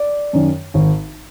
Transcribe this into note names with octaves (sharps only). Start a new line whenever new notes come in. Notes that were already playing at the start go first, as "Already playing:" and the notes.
Already playing: D5
F#2 D#3
G#1